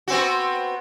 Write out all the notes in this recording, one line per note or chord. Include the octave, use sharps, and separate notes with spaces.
B3 C4 F#4